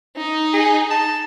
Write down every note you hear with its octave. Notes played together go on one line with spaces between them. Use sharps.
D#4
G#4
A5